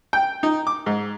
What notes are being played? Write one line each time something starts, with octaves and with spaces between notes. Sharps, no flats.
G5
D#4
D6
G#2